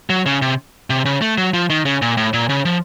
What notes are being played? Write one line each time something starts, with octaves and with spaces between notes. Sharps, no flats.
F#3
C#3
C3
C3
C#3
A3
F#3
F3
D#3
C#3
A#2
A2
A#2
C#3
F3